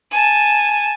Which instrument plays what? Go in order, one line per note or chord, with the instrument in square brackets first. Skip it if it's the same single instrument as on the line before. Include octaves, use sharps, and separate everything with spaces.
[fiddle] G#5 A5